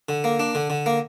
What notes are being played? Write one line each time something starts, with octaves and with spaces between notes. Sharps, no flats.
D3
A#3
D4
D3
D3
A#3